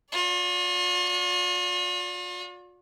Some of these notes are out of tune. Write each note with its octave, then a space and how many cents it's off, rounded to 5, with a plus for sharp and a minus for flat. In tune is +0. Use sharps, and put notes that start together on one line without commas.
F4 +45 D5 -25